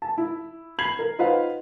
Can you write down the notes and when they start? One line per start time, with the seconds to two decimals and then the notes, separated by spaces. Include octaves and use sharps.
0.02 A5
0.18 E4
0.79 B5 G#6 C7 F#7
0.99 A#4
1.19 D#4 F4 B4 C5 F5 F#5